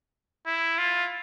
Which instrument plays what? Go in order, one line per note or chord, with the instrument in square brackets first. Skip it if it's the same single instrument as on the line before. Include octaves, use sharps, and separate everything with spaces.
[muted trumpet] E4
F4